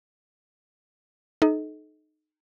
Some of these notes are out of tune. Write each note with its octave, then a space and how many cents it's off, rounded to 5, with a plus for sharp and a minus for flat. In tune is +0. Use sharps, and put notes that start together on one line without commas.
D#4 -15 A4 -40 D#5 +30